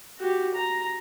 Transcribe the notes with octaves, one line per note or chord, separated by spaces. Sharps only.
F#4 G4
A#5